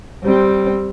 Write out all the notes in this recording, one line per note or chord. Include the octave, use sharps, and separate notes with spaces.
G3 C4